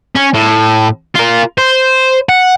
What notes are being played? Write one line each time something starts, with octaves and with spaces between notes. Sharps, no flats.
C#4
A2
F4 A#4
C5
F#5